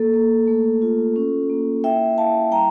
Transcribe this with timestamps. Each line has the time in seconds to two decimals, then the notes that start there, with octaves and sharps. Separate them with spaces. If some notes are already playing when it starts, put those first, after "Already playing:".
Already playing: A#3 A4
0.14 A#3
0.47 A3
0.82 F4
1.16 C#4
1.50 A#3
1.84 E4 E5 G5
2.18 E4 F5 A5
2.51 G3 G5 A#5